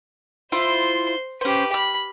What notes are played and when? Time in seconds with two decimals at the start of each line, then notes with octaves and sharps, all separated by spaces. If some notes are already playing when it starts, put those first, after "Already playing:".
0.52 E4 F4 C5 F5 C6
1.41 C#4 G4 B4 C5
1.74 B5 F6